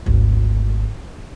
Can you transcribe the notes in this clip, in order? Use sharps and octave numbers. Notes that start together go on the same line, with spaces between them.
G#1 D2